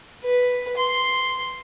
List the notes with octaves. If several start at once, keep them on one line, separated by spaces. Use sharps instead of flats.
B4
C6